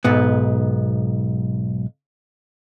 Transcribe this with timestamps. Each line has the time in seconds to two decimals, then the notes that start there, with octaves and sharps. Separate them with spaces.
0.05 B1 G#2 B3